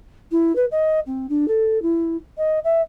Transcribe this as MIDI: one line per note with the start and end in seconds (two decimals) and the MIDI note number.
0.31 0.55 64
0.55 0.65 71
0.71 0.99 75
1.06 1.26 60
1.29 1.48 62
1.48 1.81 69
1.82 2.16 64
2.37 2.59 75
2.64 2.81 76